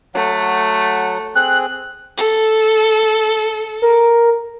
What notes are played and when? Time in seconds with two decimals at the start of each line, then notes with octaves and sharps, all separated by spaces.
0.14 F#3 A3 F#5
1.35 C4 G#4 F#6
2.17 A4
3.82 A#4